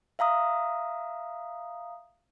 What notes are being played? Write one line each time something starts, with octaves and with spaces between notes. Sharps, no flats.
E5 F5 A#5 D#6